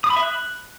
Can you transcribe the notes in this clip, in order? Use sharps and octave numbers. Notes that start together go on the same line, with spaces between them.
D#6
B5
E5
F#6